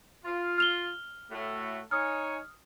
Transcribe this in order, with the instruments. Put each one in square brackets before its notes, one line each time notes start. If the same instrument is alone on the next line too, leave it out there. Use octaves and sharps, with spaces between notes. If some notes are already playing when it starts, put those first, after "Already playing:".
[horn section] F4
[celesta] F6 F7 G7
[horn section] A2 A3 F#4
[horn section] D#4 C#5 G#5 [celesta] D#6 F6